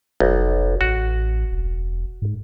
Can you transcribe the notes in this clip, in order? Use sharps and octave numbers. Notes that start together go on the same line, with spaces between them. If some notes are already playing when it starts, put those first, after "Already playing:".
F1 B1
A1 F#4
E1
G#2